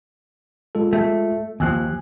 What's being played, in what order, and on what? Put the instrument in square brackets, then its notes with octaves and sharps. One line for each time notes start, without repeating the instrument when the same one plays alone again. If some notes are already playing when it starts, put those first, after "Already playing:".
[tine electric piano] G#3 F4 A4
[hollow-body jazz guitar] A3
[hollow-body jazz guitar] D#2 F3 [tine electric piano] G#5 E6 F#6